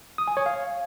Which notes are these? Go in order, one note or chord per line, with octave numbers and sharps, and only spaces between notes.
D#6
G#5
C#5
F5